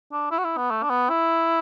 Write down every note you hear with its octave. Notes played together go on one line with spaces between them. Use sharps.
D4
E4
F#4
E4
B3
A3
D4
B3
E4